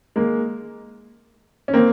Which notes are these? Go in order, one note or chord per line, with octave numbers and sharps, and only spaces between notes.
G#3 A#3
C#4
A#3 C4